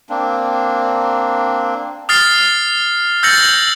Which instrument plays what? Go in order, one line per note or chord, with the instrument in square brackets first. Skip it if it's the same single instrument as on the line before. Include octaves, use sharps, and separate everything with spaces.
[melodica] A#3 C4 D4
[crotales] D#6 F6 A6 C7
E6 G6 A6 A#6 C#7 F#7